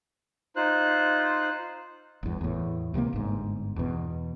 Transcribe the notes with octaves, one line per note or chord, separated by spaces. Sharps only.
D#4 F4 C5 F#6
G1 E2
E2 A2
C#2 C3 F#3 A#3
G1 G#2
E2 B2